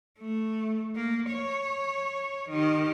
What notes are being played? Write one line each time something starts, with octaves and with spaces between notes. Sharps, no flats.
A3
A#3
C#5
D#3 G4